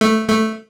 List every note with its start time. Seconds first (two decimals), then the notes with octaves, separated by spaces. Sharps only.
0.01 A3
0.29 A3